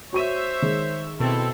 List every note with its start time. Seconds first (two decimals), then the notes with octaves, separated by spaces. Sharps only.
0.13 F#4 C5 C#5 E5 C#6 D#7
0.62 D#3 G#3
1.20 B2 C4 E4 A4